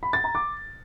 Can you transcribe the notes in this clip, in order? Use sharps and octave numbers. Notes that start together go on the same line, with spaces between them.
B5
A6
A#5
D6